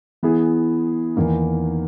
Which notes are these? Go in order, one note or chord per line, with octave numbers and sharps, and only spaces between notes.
E3 B3 E4 G#4
E2 D#3 A#3 D#4